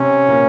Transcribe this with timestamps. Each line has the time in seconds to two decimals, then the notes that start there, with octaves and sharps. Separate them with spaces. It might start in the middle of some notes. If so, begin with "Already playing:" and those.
Already playing: C3 C4 C#4
0.28 A#2 A#3